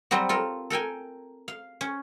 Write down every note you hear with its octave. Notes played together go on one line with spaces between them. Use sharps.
F#3 G3 C4 F#4
F4 A4 A#4
A4 A#4 G5 G#5
F5
C#4